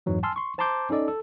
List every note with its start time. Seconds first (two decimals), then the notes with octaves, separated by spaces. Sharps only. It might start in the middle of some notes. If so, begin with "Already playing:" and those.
0.06 F2 G#2 E3 F#3 G#3
0.23 G#5 A5 C6 E6 F6
0.36 C6 C#6
0.58 C5 A5 A#5 C6 D6 G6
0.90 C#4 D#4 A4 D5 D#5
1.08 A4